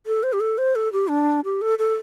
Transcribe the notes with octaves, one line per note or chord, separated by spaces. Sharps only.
A4
C5
G4
A4
C5
A4
G4
D4
G4
A4
A4